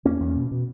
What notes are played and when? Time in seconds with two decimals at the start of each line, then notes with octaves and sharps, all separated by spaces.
0.05 E2 A#3 C#4
0.21 E2
0.36 B2
0.51 B2